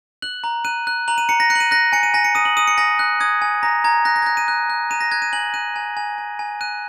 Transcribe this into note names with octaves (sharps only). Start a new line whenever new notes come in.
F#6 F#7
A#5
F#6 D#7
F#6
A#5 F#7
D#7
A#5 C#7
A#6
F#6 C#7
F#7
D#7
F#6 A#6
G#5 C#7
D#7
G#5 A#6
C#7
D#6 D#7
F#7
D#6 D#7
C#7
G#5 A#6
F#6
D#6 G#6
G#5
A#5 A#6
A#5 G#6
F#6 A#6
A#6
G#6
F#6 A#6
D#7
F#6
F#6
A#5 D#7
A#6
F#6 G#6
D#7
G#5 F#7
F#6 D#7
G#5 D#7
G#5
G#5
G#5
F#6 D#7